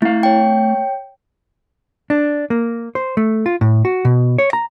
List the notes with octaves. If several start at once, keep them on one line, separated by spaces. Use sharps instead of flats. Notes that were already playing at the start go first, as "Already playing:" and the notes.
A3 E4 F5
C#5 G5
D4
A#3
C5
A3
F4
A2
F#4
B2
C#5
A#5